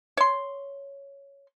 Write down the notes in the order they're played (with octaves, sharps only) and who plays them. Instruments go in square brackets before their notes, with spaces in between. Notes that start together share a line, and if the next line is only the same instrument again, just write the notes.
[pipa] C#5 C6